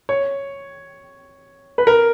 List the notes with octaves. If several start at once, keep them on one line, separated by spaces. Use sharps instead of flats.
C#5
B4
A#4